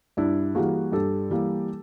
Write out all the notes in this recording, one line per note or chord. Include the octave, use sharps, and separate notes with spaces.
G2 D4 E4
E3 G3 A#3 F#4 G#4
G2 G4 A4
E3 G3 A#3